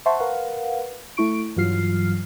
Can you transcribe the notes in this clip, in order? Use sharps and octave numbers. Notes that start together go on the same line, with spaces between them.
C5 E5 F#5 A5 C6 C#6
A#4 B4 F5 F#5
A3 E4 C#6 D7
G2 E3 F#3 F4 F6 C7